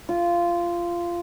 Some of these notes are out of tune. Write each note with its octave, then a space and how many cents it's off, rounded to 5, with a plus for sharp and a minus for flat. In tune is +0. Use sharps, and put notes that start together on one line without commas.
F4 -15